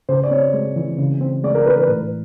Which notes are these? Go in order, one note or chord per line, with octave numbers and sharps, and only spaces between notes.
C#3 C5
D5
C4 C#5
G#3
E3
C#3
C4
G#3 D5
A#4
E3 B4
B4
A2